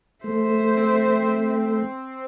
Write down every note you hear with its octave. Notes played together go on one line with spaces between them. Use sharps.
A3 C5 E5
C4